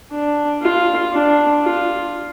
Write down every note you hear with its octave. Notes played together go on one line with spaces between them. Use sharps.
D4
F4
D4
F4